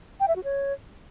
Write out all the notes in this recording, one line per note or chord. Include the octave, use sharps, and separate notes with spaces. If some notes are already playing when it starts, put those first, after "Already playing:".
G5
E5
F#4
C#5